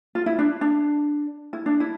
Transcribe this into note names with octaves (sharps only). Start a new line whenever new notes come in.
F4
E4
D4
D4
E4
D4
E4